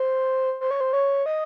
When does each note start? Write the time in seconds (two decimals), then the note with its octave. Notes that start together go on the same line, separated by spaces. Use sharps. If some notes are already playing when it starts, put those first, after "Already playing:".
Already playing: C5
0.61 C5
0.71 C#5
0.81 C5
0.93 C#5
1.26 D#5